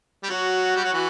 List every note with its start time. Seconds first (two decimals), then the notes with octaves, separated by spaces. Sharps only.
0.23 G3
0.29 F#3 F#4
0.75 G3
0.84 F#3
0.93 E3